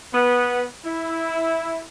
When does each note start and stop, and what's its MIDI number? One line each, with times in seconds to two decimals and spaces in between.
0.14 0.65 59
0.85 1.86 64